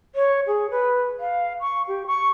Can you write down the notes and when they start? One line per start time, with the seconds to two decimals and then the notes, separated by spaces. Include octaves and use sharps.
0.15 C#5
0.47 G#4
0.71 B4
1.20 F5
1.61 C#6
1.88 G4
2.07 C#6